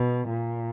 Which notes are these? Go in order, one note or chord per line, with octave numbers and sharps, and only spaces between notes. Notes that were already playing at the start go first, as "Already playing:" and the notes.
Already playing: B2
A#2